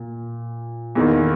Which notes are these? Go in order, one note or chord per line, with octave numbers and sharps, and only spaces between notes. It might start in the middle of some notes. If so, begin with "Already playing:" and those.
Already playing: A#2
E2 D#3 A#3